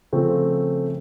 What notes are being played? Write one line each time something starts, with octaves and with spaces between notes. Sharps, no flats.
C#3 F3 A3 C4